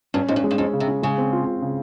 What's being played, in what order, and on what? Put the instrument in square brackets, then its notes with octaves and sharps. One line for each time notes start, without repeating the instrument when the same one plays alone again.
[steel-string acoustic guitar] G2 [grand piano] C#4
[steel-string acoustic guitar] G#2 [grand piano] C#4
[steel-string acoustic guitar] G2
[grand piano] G#3
[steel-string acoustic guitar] G2
[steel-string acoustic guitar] F2 [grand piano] C#4
[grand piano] C#3
[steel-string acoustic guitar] C3
[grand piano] C#4
[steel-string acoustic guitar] C#3 [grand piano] G#3
[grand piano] C4
F4
F4
C#3